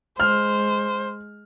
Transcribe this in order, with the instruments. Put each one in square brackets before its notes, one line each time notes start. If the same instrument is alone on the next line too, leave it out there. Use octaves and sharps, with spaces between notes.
[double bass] G#3 [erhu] C5 [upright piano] F6